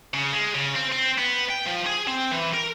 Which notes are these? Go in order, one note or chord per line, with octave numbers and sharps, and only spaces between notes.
C#3
G#3
C#3
C4
C4
B3
G5
F3
G#4
C4
E3
A#4